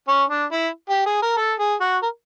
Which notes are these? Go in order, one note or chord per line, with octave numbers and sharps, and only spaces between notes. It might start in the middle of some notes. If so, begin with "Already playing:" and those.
C#4
D4
E4
G4
G#4
A#4
A4
G#4
F#4
A#4